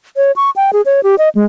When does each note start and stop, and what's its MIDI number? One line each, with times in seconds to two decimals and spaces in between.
0.16 0.32 73
0.36 0.50 85
0.56 0.71 79
0.73 0.82 68
0.86 1.01 73
1.04 1.15 67
1.18 1.29 75
1.35 1.45 56